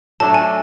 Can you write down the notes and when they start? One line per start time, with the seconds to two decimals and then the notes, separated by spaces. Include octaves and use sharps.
0.20 F#3 A3 D4 A5
0.34 G#5